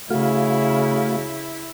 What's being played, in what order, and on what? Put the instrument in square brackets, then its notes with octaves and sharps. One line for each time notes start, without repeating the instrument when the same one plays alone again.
[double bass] C#3 [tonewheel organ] A3 F#4 F5 [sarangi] E4